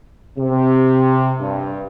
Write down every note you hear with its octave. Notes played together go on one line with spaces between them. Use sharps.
C3
G2